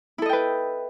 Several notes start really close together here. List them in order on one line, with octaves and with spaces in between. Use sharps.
E4 A4 D#5 G5 B4